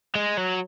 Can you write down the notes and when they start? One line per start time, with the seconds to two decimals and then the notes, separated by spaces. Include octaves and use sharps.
0.15 G#3
0.37 F#3